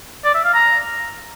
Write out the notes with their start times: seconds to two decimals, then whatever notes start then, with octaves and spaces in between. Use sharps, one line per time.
0.25 D5
0.35 E5
0.44 F5
0.54 A#5